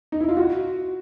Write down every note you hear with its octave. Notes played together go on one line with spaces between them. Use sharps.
D#4
E4
F4
F#4